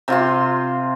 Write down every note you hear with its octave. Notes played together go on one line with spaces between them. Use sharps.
C3 F4 C6